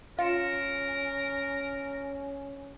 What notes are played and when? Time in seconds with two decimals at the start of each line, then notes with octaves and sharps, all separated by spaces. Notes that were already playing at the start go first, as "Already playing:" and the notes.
0.19 C#4 F4 A#4 C#7 E7